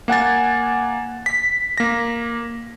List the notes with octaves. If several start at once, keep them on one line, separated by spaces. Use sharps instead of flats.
A#3 F#5 G#5 A6
B6
A#3 A#6